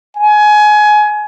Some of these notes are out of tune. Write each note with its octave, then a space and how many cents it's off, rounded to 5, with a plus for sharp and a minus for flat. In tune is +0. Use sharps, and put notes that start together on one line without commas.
G#5 +20